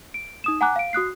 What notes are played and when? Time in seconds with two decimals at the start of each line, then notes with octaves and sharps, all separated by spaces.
0.14 D7
0.44 D#4 D#6 E7
0.61 F#5 G#5 A#5 D6 F#6
0.76 F5 D7
0.93 F#4 D#6 F#6 C7